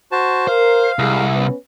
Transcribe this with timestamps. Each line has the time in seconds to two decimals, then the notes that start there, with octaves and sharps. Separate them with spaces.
0.12 F#4 C5 A5
0.48 A#4 C5 F5
0.99 C2 G#3 G#4
1.35 B3 C#4 B4